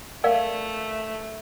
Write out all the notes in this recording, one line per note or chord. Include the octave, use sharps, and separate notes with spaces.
A3 A#4 D5 F5